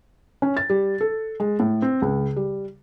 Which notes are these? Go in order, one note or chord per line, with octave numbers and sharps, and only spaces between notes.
C#4
A6
G3
A4
G#3
A2
C4
C#2
G3